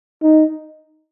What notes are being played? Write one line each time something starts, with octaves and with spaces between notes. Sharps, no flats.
D#4